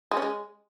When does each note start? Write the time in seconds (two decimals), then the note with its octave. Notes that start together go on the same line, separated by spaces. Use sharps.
0.11 G#3
0.17 C#4
0.22 G#3